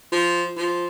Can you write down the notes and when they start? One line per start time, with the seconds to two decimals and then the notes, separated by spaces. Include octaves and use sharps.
0.12 F3
0.57 F3